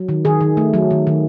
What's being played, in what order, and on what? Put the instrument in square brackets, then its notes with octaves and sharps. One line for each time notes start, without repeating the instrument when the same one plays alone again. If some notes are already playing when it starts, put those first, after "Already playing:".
Already playing: [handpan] F#3
D#3
D#3 G#4
D#3
A3
F#3
D#3
D#3